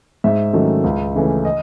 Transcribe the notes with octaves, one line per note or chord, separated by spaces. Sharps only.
G#2 E5
D#3 F#3 A3 C#4
C#2
C#3 E3 A3 C#4
D#5